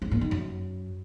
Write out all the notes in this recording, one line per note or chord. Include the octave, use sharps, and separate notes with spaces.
G2
A#2
D#3
F#2